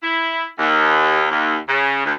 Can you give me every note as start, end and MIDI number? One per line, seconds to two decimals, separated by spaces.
0.03 0.45 64
0.59 1.25 39
1.31 1.58 39
1.68 2.02 49
2.05 2.13 38